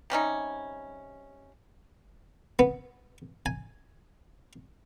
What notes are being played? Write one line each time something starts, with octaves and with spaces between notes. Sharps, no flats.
C3 G3 C#4 D#4
B3
G#5